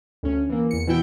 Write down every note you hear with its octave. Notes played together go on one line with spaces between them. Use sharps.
D2 C#4
E3 A#3
E2 C#7
B2 E3 E4 G5